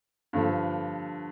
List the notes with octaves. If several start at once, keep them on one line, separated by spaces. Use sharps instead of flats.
G2 D3 F3